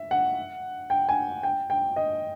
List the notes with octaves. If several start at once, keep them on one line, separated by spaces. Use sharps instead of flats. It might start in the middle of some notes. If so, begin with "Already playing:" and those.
Already playing: E5
F#5
G5
G#5
G5
G5
D#5